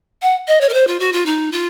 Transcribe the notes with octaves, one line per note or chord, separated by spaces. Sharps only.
F#5
D#5
C#5
A#4
C5
F4
F#4
F4
D#4
F4